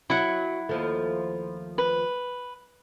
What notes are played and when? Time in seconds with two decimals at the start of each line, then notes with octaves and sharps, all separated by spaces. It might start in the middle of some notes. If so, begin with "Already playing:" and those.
0.10 F#3 E4 F#5
0.69 D#2 F3 A3
1.78 B4